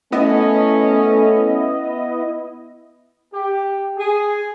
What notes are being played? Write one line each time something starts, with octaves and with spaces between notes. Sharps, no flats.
A3 B3 C#4 E4 D#5
G4
G#4